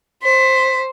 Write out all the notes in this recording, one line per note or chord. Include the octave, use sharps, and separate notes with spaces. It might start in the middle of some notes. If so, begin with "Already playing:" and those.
C5 B6